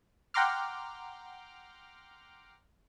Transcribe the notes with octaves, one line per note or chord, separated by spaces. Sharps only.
F#5 G5 A#5 C6 D6 F6